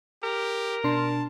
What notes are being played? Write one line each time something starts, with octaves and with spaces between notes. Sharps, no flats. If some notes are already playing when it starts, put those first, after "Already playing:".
G4 A#4
B2 D4 A5 C6